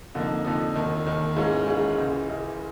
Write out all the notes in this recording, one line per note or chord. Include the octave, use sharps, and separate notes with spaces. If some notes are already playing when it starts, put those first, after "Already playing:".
F2 D3 F3 A#3 D#4
F2 D3 F3 A#3 D#4
E1 D#2 D#3
E1 D#2 D#3
G#2 E3 G#3 C#4 F4
G#2 E3 G#3 C#4 F4
C#2 C#3 E3
C#2 C#3 E3